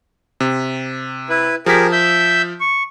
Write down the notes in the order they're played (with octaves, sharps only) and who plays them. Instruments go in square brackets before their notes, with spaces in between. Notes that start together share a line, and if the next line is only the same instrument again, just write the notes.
[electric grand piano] C3
[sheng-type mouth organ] E4 B4
[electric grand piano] F3 B6 [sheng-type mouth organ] G4 G#4 A#4
[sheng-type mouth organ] E5 E6 G6
C#6